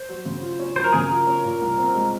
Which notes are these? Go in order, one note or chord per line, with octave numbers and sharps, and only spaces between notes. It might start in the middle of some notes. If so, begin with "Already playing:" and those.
Already playing: C5
F#3
C#3
F4
C#4
F#3 C5
A#4
C#3 G#4
A#4
F4
C#4
A#2
C2
C4
G#3